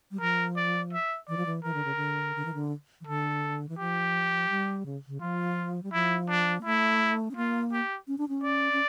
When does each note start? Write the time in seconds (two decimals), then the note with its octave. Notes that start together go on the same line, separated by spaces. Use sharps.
0.11 G3
0.21 F3 A#4
0.56 D5
0.93 E5
1.28 E3 D5
1.37 F3
1.46 E3
1.64 E3 A#4
1.74 D3
1.85 C#3
1.96 D3
2.36 D3
2.45 E3
2.54 D3
3.01 E3
3.07 D3 A4
3.69 E3
3.78 F3 G4
4.50 G3
4.86 C#3
5.08 C#3
5.21 F3 F4
5.83 G3
5.93 F3 E4
6.29 D4
6.61 A#3
6.65 A3 E4
7.31 C#4
7.36 A#3 F4
7.72 G4
8.08 C#4
8.18 D4
8.29 C#4
8.43 D5
8.73 C#4